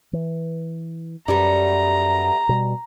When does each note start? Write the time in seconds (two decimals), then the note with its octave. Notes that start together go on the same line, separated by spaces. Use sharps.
0.13 E3
1.28 F#2 G3 A3 B3 A#5
2.49 B2 G3